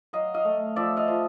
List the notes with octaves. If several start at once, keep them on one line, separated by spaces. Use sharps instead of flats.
F#3 D#5 F5
D#5 F5
A3
F3 D5 E5
D#5 F5
F3